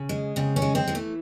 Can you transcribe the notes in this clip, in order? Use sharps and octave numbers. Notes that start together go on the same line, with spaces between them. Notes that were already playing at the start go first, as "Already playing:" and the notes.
Already playing: C#3
G#3
C#3 C4
C#4
G#3
C4
E3 G#3
A3